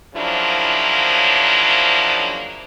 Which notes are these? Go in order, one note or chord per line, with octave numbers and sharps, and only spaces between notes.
C#3 F3 F#3 A#3 D4 E4